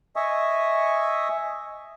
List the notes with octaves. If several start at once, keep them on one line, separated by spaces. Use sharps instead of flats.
D#5 E5 G#5 C#6 D#6